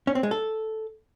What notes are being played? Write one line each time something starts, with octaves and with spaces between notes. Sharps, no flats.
C#4
C4
G#3
A4